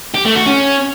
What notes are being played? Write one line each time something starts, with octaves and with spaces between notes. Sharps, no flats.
G4
A3
F#4
C#4